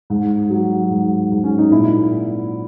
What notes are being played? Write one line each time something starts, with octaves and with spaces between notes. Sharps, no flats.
G#2
F#3
G#2
G#2
C#4
D#4
A#2 E4